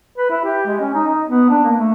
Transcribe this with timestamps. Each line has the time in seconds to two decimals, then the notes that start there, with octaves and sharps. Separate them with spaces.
0.18 B4
0.30 E4
0.44 G4
0.66 G#3
0.80 C#4
0.94 D#4
1.07 D#4
1.28 B3
1.49 D4
1.63 A#3
1.77 A3